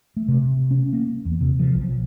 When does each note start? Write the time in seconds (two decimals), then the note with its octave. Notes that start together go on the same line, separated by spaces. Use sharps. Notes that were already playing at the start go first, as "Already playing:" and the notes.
0.17 A3
0.28 C3
0.71 C#4
0.93 A#3
1.25 E2
1.41 C3
1.59 F3
1.75 B1